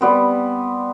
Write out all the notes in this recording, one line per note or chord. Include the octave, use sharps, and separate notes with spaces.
G3 B3 C4